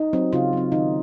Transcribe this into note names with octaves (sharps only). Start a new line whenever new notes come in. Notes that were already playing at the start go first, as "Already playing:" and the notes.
Already playing: D#4
F#3 C4
C#3 F4
F#3 C4
D#3 D#4